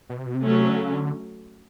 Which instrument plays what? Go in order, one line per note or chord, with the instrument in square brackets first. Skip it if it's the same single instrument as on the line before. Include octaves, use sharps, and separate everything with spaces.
[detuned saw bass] B2
C3
B2
C3
[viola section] F#3 A3 C#4
[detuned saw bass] D3
C#3
D3